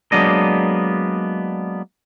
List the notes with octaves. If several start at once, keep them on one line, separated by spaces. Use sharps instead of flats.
F#3 G#3 A#3 B3 D4 D#5